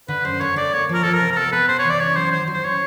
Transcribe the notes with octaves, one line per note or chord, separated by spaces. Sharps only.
D3 B4
F#2 C5
D3 C#5
D3 D5
A#3 C#5
F3 A#4
F3 A4
A#4
C3
A#4
B3 A4
B3 B4
C3 C5
C#5
E3 D5
C#4 C#5
F#3 C5
D#3 C5
F#3
C5
C#4 C#5